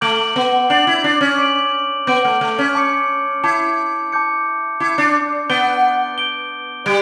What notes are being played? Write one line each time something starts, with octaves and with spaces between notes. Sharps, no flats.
A3 D6 G6 D7 F#7
B3
D4 D6 G6 D7 F#7
E4
D4
C#4
D6 G6 D7 F#7
B3 D6 G6 D7 F#7
A3
A3
C#4
A5 D6 G6 C#7
E4 A5 D6 G6 C#7
A5 D6 G6 C#7
E4 A5 D6 G6 C#7
D4
B3 G6 D7 G7
G6 D7 G7
G3 G6 D7